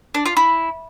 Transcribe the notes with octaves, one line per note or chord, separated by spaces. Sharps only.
D4
F4
E4